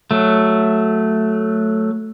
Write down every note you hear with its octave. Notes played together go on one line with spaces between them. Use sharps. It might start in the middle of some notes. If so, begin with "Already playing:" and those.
F#3 A3